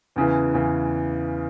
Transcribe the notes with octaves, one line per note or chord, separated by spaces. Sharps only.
E2 C#3 E3
E2 C#3 E3